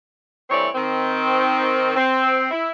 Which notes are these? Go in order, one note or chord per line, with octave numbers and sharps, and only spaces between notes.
G2 E3 A3 C4 C#5 D5
D#3 C4
C4
E4